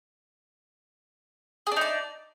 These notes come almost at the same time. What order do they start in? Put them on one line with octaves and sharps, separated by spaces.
G#4 D4 D#4 D5